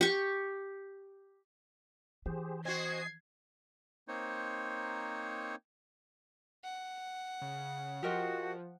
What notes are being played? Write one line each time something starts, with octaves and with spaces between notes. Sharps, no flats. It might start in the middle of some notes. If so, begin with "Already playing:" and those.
G4 C#6
E3 G4 G#4 C5
C4 F#4 D#5 G#5 G#6 C7
A#3 C4 D#4 C5 C#5
F#5
C#3
F3 F#4 G4 A#4 D#5